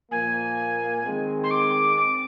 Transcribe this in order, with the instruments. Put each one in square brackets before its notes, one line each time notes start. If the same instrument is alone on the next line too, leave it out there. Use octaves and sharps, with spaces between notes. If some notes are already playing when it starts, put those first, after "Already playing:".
[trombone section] A#2 F3 A#3 [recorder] G#5
[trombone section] D#3 G#3 C4
[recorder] C6
D6
[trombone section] C4 [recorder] D6